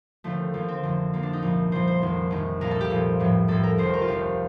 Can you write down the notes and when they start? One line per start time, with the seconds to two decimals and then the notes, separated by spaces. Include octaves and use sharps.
0.24 D#2 D3 F3 A3
0.54 D#2 D3 F3 A#3
0.68 C4
0.83 F1 F2 D3
1.13 F1 F2 D3 A#3
1.23 D4
1.33 D#4
1.42 C2 A#2 F3
1.72 C2 A#2 F3 C5
1.87 C5
2.02 F1 F2 D#3
2.30 F1 F2 D#3
2.61 C2 A#2 F3 A#4
2.71 A4
2.80 G4
2.90 C2 A#2 F3
3.19 A1 A2 F3
3.48 A1 A2 F3 A4
3.63 A#4
3.78 F1 D#2 D#3 C5
3.93 A#4
4.01 F4
4.08 F1 D#2 D#3 G4